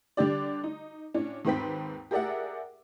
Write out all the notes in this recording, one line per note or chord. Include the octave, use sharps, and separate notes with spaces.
D3 G3 D4 G4 D5
D#4
A2 C#4 D4
D#2 G#2 C4 B4 G5 B6
G4 G#4 A#4 D5 E5 F#5